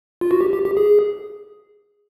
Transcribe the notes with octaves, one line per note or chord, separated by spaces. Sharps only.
F4
F#4
G4
G4
G4
G#4